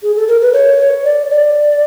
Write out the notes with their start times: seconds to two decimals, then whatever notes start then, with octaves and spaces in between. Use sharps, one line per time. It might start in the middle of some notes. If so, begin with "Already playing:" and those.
0.03 G#4
0.16 A4
0.28 A#4
0.42 B4
0.53 C#5
1.04 D5
1.30 D5